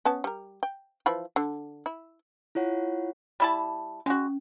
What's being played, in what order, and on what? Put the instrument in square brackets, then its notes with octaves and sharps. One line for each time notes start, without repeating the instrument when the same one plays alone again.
[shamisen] B3 C#4 A5
G3 A#4
G5
E3 F3 B5
D3
E4
[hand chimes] E4 F4 C#5 F#5
[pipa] G3 E4 A5
[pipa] G#3 F#4 [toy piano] C#4